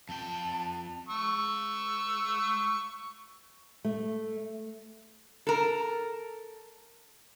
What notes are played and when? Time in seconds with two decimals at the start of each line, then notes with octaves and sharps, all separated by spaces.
0.09 F2 G5 A5
1.09 C#6 E6
3.85 A3
5.47 A4 A#4